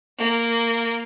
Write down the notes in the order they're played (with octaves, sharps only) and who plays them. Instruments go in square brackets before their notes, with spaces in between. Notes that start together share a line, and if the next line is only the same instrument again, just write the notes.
[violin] A#3